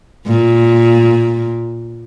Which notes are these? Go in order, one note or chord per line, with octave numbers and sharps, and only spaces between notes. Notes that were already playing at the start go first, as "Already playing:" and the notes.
A#2